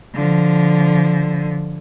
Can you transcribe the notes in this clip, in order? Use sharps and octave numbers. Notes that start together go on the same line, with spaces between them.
D3 F3